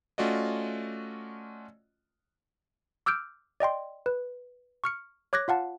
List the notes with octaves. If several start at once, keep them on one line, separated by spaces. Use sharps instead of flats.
A3 C#4 F4 F#4 D5 D#5
D6 E6 F6 G6 D7
D5 D#5 G5 C6
B4
C#6 F6 C#7
C#5 D6 F#6 G#6 A#6
F4 F5 F#5 A5